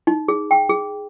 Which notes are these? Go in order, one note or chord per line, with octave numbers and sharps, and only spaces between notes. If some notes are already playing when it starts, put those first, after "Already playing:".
D#4
G#4
G5
G#4